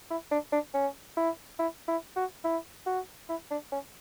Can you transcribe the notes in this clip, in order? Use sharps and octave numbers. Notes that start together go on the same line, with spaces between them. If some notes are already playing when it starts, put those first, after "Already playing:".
E4
D4
D4
C#4
E4
E4
E4
F#4
E4
F#4
E4
D4
C#4